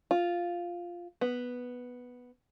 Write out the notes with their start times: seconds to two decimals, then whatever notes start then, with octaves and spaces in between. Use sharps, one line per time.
0.11 F4
1.21 B3